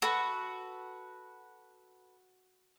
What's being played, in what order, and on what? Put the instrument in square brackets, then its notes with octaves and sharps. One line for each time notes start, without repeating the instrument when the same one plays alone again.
[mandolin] F#4 [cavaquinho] A4 B4